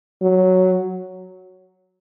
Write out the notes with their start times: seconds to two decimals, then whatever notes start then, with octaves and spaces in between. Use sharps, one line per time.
0.22 F#3